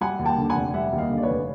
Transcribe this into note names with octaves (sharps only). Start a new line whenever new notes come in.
G3 F#5 G#5
D#2
G5 A5
D3
F#5 G#5
F1
G3 E5 F#5
D#2
D#5 F5
D3
D5
B4 C#5
F1